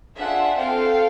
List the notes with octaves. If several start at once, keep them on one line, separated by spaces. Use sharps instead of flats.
D4 F4 G#4 E5 F#5
C4 F4 A4 F5 G5